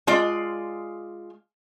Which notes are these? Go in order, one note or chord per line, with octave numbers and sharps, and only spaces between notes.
G#3 F4 D5